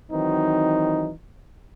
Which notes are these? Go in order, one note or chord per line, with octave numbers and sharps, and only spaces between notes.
D#3 E3 F#3 C4 D#4